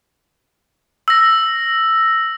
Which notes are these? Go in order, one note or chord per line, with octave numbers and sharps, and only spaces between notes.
E6 A#6